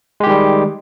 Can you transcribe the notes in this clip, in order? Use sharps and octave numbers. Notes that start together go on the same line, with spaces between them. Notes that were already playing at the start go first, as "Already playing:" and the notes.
D#3 G3 G#3 G4